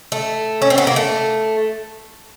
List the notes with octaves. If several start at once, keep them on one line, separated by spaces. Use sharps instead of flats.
A3
C#4
C4
B3
A#3
A3